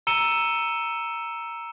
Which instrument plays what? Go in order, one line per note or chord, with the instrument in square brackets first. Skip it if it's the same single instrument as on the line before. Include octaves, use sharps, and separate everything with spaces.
[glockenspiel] A#5 E6 C#7 D#7 E7 G7